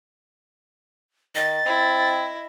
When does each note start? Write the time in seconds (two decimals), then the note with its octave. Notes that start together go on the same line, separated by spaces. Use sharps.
1.35 D#3 D#5 A6
1.66 C4 E4